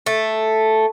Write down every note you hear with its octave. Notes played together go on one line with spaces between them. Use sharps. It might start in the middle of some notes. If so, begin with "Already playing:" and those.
A3